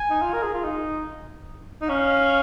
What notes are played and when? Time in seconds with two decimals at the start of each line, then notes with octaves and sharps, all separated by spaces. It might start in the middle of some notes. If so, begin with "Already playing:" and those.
Already playing: G#5
0.10 D#4
0.22 F4
0.33 A#4
0.43 G#4
0.54 F4
0.64 D#4
1.81 D#4
1.88 C#4 F5